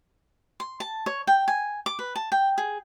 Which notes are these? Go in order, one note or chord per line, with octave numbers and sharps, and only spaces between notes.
C6
A5
C#5
G5
G#5
D6
B4
A5
G5
G#4